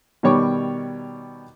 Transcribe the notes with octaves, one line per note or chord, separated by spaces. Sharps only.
B2 D#3 G3 C#5 C#6 D6